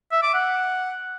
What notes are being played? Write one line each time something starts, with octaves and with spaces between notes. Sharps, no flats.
E5
D6
F#5